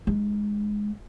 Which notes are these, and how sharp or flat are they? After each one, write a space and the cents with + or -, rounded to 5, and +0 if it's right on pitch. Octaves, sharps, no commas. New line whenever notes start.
G#3 +0 D#4 -30